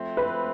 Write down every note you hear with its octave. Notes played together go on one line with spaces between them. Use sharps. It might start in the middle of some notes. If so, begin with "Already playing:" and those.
Already playing: F3 A3 C4
B4